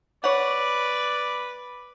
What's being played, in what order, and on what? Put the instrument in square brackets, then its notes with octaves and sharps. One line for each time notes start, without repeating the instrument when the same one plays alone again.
[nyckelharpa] B4 [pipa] C#5 F#5 [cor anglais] D5